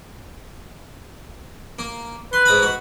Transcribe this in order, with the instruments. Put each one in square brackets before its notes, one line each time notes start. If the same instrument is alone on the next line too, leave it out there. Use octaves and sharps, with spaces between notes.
[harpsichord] A#3
[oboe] B4 [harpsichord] C6
[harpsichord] G#2 A#5 B5
F#4